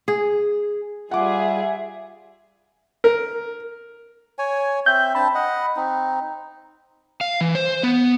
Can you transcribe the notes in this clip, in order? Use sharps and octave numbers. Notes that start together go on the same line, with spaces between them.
G#4
G3 F4 G#4 E5 F#5 D6
A#4
C#5 G#5
C4 E5 G6
C4 D4 A5 B5
D#5 F#5
C4 D#4
F5
E3
C5
B3